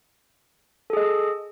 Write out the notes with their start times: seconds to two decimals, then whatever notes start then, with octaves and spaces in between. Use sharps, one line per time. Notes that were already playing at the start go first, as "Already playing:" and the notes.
0.90 A4
0.93 G#4
0.97 D#5